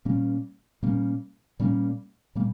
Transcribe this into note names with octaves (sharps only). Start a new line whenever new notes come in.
A#2 G3 A#3 C#4
A#2 G3 A#3 C#4
A#2 G3 A#3 C#4
A#2 G3 A#3